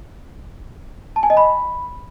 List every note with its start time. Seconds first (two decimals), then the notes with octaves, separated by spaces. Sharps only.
1.16 A5
1.23 G#5
1.30 D#5
1.37 B5